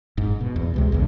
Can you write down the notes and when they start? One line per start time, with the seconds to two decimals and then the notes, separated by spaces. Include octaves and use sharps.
0.17 F#1 G#2
0.41 B2
0.56 E2
0.74 C#2 C3 G#3
0.92 A#1 E2 D3